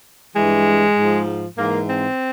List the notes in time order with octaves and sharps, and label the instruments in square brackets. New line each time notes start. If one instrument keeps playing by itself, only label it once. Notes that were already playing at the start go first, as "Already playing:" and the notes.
[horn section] G2 E3 G#3
G#2 F3
G#2 E3 A#3
C4